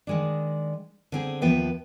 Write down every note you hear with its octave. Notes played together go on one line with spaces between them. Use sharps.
D#3 G#3 D4
D3 C4 G#4
D#2 F3 B3 B4 E5 G5